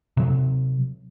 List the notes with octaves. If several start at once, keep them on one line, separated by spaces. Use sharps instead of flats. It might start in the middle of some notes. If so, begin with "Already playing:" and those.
C3 F#3